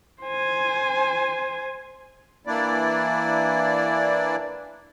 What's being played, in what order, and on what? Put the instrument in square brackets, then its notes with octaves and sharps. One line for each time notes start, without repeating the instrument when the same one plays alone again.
[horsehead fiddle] C5 G#5
[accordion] E3 A#3 D4 E4 D5